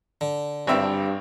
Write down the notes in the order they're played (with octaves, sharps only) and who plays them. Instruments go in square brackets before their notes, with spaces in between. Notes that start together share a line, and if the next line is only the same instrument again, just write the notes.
[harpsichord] D3
[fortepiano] G#1 C4 E5 [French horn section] G2